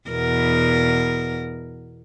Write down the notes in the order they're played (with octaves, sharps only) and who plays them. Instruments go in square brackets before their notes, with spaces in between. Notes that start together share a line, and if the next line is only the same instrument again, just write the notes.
[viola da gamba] E2 B2 A#4